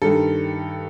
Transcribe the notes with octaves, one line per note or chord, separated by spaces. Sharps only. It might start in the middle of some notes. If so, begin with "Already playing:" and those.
G2 D#3 A4